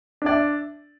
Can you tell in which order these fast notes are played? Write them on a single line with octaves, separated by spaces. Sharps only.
D4 D5 E5